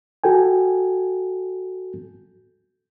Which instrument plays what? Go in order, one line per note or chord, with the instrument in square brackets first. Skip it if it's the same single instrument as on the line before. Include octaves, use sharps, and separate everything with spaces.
[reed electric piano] F#4 A4 G5 G#5